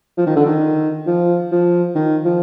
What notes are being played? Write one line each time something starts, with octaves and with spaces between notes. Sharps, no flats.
F3
D#3
D3
D#3
F3
F3
D#3
F3